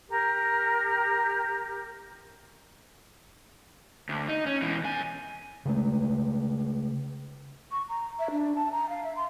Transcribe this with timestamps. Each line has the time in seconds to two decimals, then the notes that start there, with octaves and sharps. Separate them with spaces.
0.08 G4 A#4
4.09 D2
4.28 D#4
4.46 C#4
4.62 B2 E3
4.84 F#2 G#5
5.65 C#3 G#3 A3
7.71 C#6
7.89 A#5
8.19 E5
8.31 D4
8.55 A5
8.71 A#5
8.89 F5
9.04 E5
9.16 C6